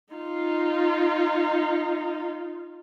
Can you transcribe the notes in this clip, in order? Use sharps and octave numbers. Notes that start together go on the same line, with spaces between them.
D#4 F4